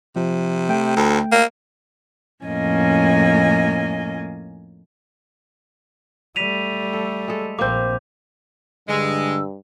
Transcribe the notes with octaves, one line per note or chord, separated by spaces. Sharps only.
C3 F3
A3 G5
D2
A#3
F2 A2 A#3 C#4 D#5 G#5
G3 A3 B6 D#7 F7
A4
G#3 A4
A#1 A#3 C4 D6 G6
G2 D3 G#3 E6